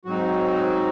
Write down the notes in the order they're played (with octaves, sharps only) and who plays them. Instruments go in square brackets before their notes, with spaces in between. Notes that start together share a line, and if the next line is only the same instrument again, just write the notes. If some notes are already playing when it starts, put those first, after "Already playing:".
[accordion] G#2 F#3 C4 D#4 F#4